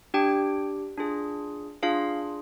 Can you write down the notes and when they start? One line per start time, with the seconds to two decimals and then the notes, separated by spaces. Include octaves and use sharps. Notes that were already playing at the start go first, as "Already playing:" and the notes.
0.14 D4 G4 G5
0.98 D4 F4 G#4
1.82 D4 F4 G#4 F5